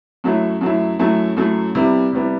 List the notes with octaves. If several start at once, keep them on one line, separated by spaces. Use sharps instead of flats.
F#2 F#3 A3 E4
F#2 F#3 A3 E4
F#2 F#3 A3 E4
F#2 F#3 A3 E4
C3 G3 B3 E4
C3 G3 B3 E4